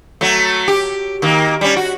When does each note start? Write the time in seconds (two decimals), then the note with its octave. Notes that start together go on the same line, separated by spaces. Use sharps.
0.21 F#3 A3
0.68 G4
1.22 D#3 A#3
1.61 G3 C#4
1.76 F#4